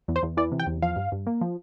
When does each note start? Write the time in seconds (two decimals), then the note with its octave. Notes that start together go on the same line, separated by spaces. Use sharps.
0.08 E2
0.16 C5
0.23 E2
0.37 E3 D5
0.52 C3
0.60 G5
0.67 E2
0.82 F3 F5
0.96 G2
1.12 G2
1.27 A#3
1.41 F3